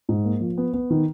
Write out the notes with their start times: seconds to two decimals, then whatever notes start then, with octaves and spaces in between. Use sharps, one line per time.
0.09 G#2
0.25 A#3
0.41 F3
0.58 B3
0.73 B3
0.90 D#3